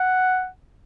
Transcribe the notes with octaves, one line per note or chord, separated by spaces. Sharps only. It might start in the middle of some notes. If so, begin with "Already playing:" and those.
Already playing: F#5